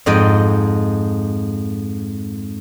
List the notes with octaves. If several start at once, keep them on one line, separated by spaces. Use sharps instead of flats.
F2 G#2 D#5 G5